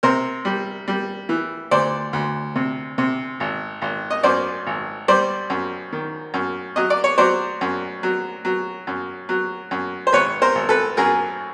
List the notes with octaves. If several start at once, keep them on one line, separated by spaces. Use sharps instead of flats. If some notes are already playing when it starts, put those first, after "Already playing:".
C3 A#4 C5
G3
G3
E3
D2 C5 D5
D2
C3
C3
G#1
G#1
D#5
F#2 C5 D5
G#1
G3 C5 D5
F#2
D#3
F#2
F#3 D#5
D5
C#5
F#3 C5 D5
F#2
F#3
F#3
F#2
F#3
F#2
C5
G#1 B4 C#5
A#4 C5
G#1
A4 B4
F#2 G#4 A#4